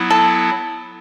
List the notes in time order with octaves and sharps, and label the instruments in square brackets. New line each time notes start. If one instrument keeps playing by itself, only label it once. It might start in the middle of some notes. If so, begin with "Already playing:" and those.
Already playing: [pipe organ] F#3 B3 E4
[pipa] A4